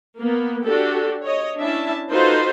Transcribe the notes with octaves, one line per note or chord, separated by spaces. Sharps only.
A#3 B3
D4 F#4 G4 A4
C#5 D#5
C#4 D4 E4 E5 A5
D#4 F4 F#4 A4 B4 C5